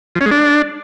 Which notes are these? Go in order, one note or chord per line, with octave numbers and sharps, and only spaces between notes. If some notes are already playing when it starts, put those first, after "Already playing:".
F3
C#4
G#3
D4